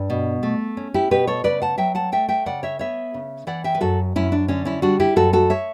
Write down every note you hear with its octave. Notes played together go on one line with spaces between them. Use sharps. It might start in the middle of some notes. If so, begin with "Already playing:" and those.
Already playing: G2
B2
A3
C#4
E4 G4
B2 G4 B4
A4 C#5
C#3 B4 D5
F#5 A5
F#3 E5 G5
F#5 A5
A3 E5 G5
E5 G5
C#3 D5 F#5
C#5 E5
B3 C#5 E5
C#3
E3 D5 F#5
E5 G5
B4
F#2 F#4 A4
F#2 C#4 E4
D4
D3 C#4
C#4 E4
G3 D4 F#4
E4 G4
F#2 F#4 A4
F#4 A4
C#5 E5